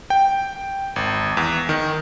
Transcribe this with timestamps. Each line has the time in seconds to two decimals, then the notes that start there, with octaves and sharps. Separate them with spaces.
0.10 G5
0.96 G#1
1.37 E2
1.69 D#3